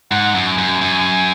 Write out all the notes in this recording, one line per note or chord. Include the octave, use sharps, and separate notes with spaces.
G#2 F#5
F#2
G#5
F#2
F#2